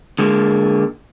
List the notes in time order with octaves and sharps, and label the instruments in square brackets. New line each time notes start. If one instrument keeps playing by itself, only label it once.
[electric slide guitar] D3 G#3 A#3